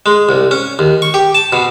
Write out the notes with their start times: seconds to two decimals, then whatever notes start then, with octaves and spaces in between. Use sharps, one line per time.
0.06 G#3
0.29 C2
0.51 C#4
0.79 D#2
1.02 C#6
1.14 G4
1.35 A5
1.53 B2